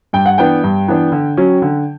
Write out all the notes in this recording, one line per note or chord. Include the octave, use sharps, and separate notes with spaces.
G2 G5
F#5
E3 B3 D4 G5
G2
E3 B3 D4
D3
F#3 C#4
D3